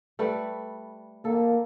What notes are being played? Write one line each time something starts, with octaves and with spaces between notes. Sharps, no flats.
G3 A3 B4
A#3 A4